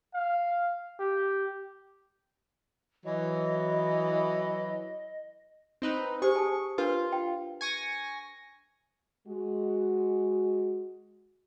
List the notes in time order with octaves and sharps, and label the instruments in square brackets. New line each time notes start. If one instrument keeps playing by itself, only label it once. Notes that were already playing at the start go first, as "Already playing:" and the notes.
[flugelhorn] F5
G4
[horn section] E3 F#3 [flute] D#5
[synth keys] C4 D#4 B4
[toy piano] G4 C5 [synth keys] G#4 C#6
[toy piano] A5 D#6
[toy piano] D4 A#4 B4 [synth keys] F4
[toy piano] G5
[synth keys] G#5 C#6 A#6
[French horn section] G#3 F#4